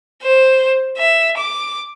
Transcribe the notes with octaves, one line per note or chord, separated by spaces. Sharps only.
C5
E5
D6